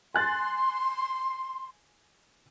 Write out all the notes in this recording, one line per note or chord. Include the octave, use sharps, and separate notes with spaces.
G#5 C6 F#6 A6